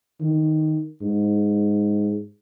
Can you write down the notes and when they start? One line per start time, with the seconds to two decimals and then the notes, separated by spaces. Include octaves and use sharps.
0.21 D#3
1.02 G#2